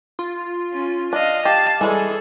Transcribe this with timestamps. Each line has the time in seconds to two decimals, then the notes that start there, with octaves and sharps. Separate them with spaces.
0.19 F4
0.73 C#4
1.13 D4 D#5 F5
1.45 G4 F5 A5
1.81 E3 G3 G#3 C#4 G#4 A4